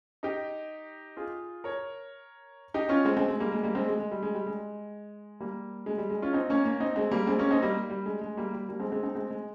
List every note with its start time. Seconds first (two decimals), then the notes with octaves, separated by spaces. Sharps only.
0.23 D#4 G4
1.17 F4 G#4
1.64 A#4 C#5
2.74 D#4 G4
2.89 C#4 F4
3.05 G#3 C4
3.17 G#3 C4
3.28 G#3
3.40 G3 A#3
3.52 G#3
3.63 G3 A#3
3.75 G#3 C4
3.88 G#3
4.00 G#3
4.11 G3
4.22 G#3
4.34 G3
4.47 G#3
5.40 G3 A#3
5.86 G#3
5.98 G3
6.10 G#3
6.22 C#4 F4
6.33 C4 D#4
6.50 A#3 C#4
6.65 A#3 C#4
6.80 C4 D#4
6.96 G#3 C4
7.11 G3 A#3
7.27 G#3 C4
7.39 A#3 C#4
7.51 C4 D#4
7.62 G3 A#3
7.90 G3
8.06 G#3
8.21 G#3
8.37 G3 A#3
8.53 G3
8.69 G3 A#3
8.80 G#3 C4
8.92 G#3 C4
9.03 C4 D#4
9.15 G#3 C4
9.30 G#3